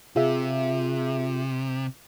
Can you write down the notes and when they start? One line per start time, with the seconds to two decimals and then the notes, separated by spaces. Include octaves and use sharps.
0.16 C3 F4 G#4 E5